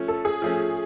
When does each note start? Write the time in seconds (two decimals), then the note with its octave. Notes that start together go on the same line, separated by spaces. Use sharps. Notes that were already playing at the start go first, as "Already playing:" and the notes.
Already playing: F3 A3 C#4
0.08 A4
0.25 G#4
0.42 F3 A3 C#4